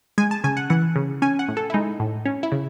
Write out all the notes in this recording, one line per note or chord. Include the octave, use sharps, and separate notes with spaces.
G#3 G#5
A5
C#3 G#5
F#5
E3 F#5
C#3
C#4 G#5
F#5
A2
A4
E4
G#3 D#4
A2
C#4
E4
C#3